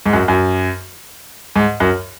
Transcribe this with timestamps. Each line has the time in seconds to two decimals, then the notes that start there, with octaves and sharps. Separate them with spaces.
0.06 G#2
0.13 F#2
0.28 F#2
1.56 G#2
1.80 F#2